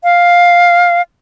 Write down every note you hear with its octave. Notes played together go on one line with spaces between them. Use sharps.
F5